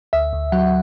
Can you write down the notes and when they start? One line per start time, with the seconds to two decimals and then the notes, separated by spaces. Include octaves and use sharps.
0.13 D2 E5
0.33 D2
0.52 F#3 F#5